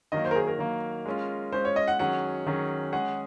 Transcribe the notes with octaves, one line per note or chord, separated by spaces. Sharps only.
D#3 F#3 A#3 D#5
C5
A#4
G#4
A#4
D#3 F#3 A#3
G#3 C#4 F4
G#3 C#4 F4 C5
C#5
D#5
F#5
D#3 F#3 C#4 G#4 F#5
D#3 F#3 C#4 G#4
G#3 C#4 G#4 F#5